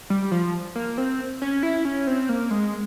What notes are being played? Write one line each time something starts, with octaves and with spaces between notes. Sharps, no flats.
G3
F3
A#3
C4
C#4
E4
C#4
C4
A#3
G#3